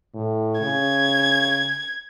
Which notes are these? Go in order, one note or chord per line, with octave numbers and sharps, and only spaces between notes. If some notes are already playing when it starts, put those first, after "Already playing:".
A2
C#3 G#6